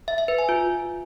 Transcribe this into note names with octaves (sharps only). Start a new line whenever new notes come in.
E5
E5
B4
G#5
F4